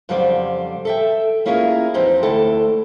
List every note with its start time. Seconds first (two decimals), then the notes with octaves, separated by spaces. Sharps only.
0.09 F2 C#3 F#3 G3 C5 D5
0.85 A4 E5 G5
1.46 A#3 C#4 E4 F4 G#4 A#4
1.94 E2 F3 C4 D#4 G4
2.23 D2 E4 A4 G5